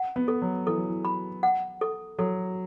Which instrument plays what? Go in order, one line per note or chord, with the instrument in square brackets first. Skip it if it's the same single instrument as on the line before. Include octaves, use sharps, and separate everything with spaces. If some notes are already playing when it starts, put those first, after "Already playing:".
Already playing: [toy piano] F#5
[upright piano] B3
[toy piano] A4
[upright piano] F#3
[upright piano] E3 [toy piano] A4
[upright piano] F#3
E3
[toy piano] B5
F#5
A4
[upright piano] F#3 [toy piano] A4